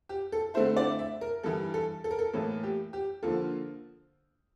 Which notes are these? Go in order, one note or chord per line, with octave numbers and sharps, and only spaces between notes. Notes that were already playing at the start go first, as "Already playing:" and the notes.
G4
A4
D3 A3 C4 E4 C5
D5
E5
A#4
G2 E3 G3 A4
A4
A4
A#4
A4
A2 E3 A#3 A4
G4
G4
D3 F3 A#3 F4 A4